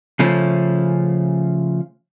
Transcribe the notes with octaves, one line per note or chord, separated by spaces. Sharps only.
C#3 F3 A3 C#4